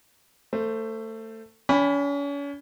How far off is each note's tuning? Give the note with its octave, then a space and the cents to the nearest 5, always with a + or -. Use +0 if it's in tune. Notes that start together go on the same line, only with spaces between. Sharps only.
A3 +20 C5 +0
C#4 +40 G#5 -30 B5 +0